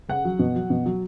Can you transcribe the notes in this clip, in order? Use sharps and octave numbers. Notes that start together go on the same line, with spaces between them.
C#3 F#5
F#3
B2
F#3
B2
F#3